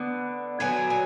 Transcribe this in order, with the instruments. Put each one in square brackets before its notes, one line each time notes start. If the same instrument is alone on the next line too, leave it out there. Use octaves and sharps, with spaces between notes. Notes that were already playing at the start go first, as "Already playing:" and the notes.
Already playing: [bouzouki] D3 B3
D3 F#3 B3 G#5
G#5